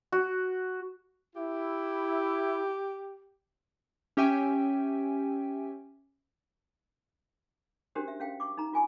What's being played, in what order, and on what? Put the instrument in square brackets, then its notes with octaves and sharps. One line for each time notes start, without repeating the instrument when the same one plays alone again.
[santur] F#4
[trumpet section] E4 [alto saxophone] G4
[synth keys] C#4 G4 E5 G5 G#5
[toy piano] C#4 D4 F#4 G4 A#4 C5
E5
C#4 F5 G5
C#6 D6
D#4 A#5
F4 G#5 C#6